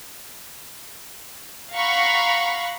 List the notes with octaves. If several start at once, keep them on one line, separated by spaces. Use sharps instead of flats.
F5 F#5 A#5 B5 C#6